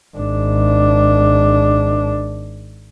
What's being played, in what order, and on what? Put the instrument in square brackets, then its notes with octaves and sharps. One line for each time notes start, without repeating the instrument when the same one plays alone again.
[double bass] G#1 D4